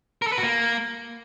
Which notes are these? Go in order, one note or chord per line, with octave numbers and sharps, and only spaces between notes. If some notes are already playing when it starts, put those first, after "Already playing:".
A#4
A4
B4
F#4
A#3